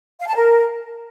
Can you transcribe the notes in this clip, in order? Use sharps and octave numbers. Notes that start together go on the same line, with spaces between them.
F5
A5
A#4